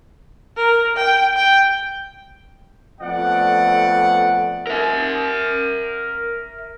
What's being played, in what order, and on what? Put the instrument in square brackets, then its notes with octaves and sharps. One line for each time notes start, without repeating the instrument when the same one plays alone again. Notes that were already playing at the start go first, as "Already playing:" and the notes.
[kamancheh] A#4
G5
G5
[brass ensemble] F2 A3 B3 D5 F#5
[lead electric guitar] A#4 E5